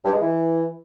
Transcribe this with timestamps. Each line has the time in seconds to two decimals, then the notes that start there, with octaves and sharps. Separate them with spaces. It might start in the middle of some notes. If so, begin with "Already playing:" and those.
0.05 G2
0.13 G#3
0.22 E3